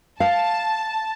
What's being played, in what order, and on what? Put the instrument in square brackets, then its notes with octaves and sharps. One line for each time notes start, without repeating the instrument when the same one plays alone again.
[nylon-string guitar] F5 [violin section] A5